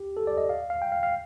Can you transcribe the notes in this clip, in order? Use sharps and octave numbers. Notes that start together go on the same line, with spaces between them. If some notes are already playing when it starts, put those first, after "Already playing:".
Already playing: G4
A4
D5
D#5
F5
F5
G5
F5
F5